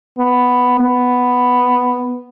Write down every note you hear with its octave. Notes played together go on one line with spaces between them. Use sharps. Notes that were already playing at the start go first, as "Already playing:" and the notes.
B3
B3